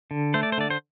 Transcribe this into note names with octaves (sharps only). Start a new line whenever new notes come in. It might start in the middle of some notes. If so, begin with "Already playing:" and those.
D3
A3 C5
D5
C5
D3 D5
C5